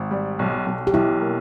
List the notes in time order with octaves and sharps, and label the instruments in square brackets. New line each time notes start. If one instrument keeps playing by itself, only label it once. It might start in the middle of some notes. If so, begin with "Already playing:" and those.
Already playing: [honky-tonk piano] G#1
G3
B1
B1
[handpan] G4
[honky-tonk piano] B1 [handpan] E4
[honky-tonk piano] A#3